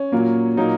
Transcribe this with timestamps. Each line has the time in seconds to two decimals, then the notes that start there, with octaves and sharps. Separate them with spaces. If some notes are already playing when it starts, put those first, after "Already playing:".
Already playing: C#4
0.12 A#2 F#3 A#3
0.57 A#2 F#3 A#3 D#4